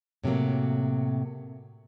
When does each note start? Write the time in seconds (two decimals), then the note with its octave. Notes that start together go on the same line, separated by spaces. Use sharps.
0.24 A2 C3 D#3 F#3 A#3